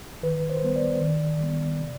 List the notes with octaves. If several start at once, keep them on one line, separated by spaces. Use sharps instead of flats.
D#3 B4
C5
B4
G3 B3 C5
D5
D#3
G3 B3
C3